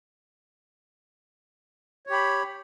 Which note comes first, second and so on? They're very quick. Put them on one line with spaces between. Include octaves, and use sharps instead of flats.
C#5 G4 B5